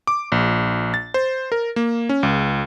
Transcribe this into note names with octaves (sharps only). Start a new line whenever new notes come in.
D6
A#1
A6
C5
A#4
A#3
C#4
C#2